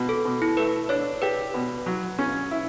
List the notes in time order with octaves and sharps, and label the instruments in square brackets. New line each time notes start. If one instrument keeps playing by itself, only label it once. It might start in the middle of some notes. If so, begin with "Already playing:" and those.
Already playing: [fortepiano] B2
[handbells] A4
[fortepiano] B2
[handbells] E4
[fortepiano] A3 [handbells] B4
[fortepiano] D4 [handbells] C#5
[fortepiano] G4 [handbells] B4
[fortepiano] B2
F#3
C#4
E4